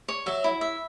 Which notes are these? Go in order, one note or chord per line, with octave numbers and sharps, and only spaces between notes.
C#5
F#3 E5
E4
E5